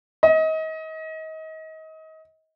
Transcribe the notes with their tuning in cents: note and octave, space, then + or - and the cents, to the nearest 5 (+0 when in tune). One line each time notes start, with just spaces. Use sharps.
D#5 +30